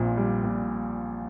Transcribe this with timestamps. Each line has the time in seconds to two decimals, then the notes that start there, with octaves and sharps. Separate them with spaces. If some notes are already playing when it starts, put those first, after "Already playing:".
Already playing: A#1 A#2 C4
0.17 G3
0.44 A#2